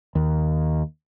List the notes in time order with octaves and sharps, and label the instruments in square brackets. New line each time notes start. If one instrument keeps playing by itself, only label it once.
[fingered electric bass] D#2